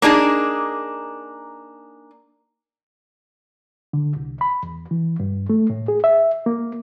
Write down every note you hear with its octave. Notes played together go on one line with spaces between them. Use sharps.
A#3 D4 D#4 G#4
D3
C2
B5
E2
E3
G2
A3
A2
G#4
E5
A#3